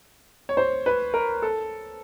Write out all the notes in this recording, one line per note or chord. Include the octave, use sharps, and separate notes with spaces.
C#5
C5
B4
A#4
A4